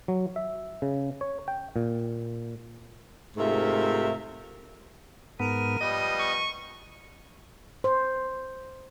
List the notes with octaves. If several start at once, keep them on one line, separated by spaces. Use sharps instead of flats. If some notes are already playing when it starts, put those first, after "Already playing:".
F#3
E5
C#3
C#5
G5
A#2
G#2 C3 A3 F4 A#4 E5
G#2 B3 A#4 D#7
F3 G3 B3 D#5
C#6
C5